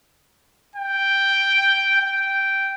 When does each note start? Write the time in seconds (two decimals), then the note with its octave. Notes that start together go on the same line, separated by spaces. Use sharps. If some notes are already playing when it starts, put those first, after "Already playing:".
0.76 G5
2.02 G5